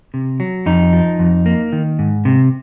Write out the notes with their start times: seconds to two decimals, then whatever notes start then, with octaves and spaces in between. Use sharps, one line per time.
0.14 C3
0.40 F#3
0.66 F2 D#4
0.93 F3
1.19 F2
1.46 A#3
1.72 D#3
1.99 G#2
2.25 C3